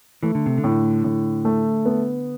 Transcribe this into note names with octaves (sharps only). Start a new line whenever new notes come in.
E3 A3
D3
C3
D3
A2
A2
A3
B3